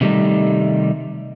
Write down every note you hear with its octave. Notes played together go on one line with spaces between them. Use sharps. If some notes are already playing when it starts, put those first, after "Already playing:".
C3 D#3 G3 A3 D#4